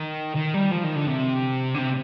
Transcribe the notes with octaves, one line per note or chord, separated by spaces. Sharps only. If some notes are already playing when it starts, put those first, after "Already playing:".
Already playing: D#3
D#3
G3
F3
D#3
D3
C3
D3
C3